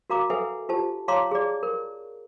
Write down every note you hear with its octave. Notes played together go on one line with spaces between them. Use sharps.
F#4 A#4 F5 A#5 D6
A4 B4 E5 F#5 G#5
F4 G4 C5 A5
C#5 F5 A5 A#5 C6 D6
G#4 D5
A#4